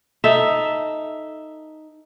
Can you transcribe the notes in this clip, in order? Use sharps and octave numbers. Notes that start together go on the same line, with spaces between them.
D#4 A4 E5